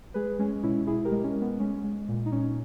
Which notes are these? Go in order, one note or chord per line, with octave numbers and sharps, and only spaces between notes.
G#3 G#4 B4
G#3 C#4
B2 C#4 E4
B2 E4 G#4
G4 A#4
G#3
C#4
G#3
B3
G#3 C#4
G#3
A#2
D#4
A#2 C#4